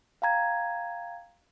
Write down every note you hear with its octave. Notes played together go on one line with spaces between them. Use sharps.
F5 G5 A#5 G#6